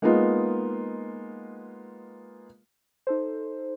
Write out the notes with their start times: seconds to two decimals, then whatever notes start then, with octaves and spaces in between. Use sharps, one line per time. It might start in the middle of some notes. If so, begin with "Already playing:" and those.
0.02 G#3 A#3 B3 D#4 F4
3.07 D#4 A4 C5